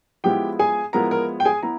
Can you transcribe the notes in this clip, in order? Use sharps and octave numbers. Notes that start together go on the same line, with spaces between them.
F3 G#3 B3 E4 G4 G5
G#4 G#5
F3 G#3 B3 E4 A#4 A#5
A#4 A#5
G5
G#4 G#5
B3 E4 A#5